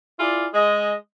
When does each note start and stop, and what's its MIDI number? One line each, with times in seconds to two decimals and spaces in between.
0.19 0.47 64
0.19 0.47 65
0.19 0.47 68
0.19 0.47 74
0.54 0.94 56
0.54 0.94 75